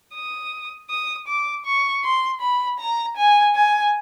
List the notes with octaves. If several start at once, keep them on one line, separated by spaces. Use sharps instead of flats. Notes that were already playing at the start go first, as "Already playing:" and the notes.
D#6
D#6
D6
C#6
C6
B5
A#5
G#5
G#5